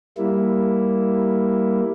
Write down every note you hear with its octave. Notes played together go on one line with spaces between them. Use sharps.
G3 A#3 E4